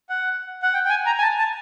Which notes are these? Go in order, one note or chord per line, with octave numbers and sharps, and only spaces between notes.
F#5
F#5
G5
G5
G#5
A#5
G#5
A5
A5